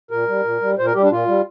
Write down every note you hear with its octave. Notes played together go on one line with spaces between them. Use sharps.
A#2 A#4
G3
A#2
G3
A#2 C5
A#4
G3 G4
D4
A#2 F4
G3